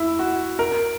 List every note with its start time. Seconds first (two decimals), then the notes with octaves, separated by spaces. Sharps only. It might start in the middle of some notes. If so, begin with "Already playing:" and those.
Already playing: E4
0.19 F#4
0.59 A#4